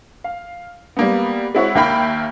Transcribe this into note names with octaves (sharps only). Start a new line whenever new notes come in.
F5
G3 A#3 B3
G#3 C4 E4 F#4 C#5
D#2 A#3 E5 F5 G5 B5